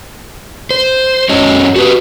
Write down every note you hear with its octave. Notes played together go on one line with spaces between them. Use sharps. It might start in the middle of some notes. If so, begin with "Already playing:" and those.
C5
F#2 F#3 C#4 C#5 D#5
F#4 G4 B4